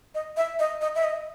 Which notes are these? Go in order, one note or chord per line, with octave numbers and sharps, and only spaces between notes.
D#5
E5
D#5
D#5
E5
D#5